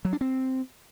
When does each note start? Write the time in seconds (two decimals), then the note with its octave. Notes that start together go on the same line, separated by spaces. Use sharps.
0.05 F#3
0.13 D4
0.21 C4